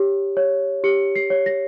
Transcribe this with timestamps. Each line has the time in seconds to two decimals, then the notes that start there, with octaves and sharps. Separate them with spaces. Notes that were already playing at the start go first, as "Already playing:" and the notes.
Already playing: G4 C#5
0.37 C#5
0.84 G4 C#7
1.16 C7
1.30 C#5
1.46 A#6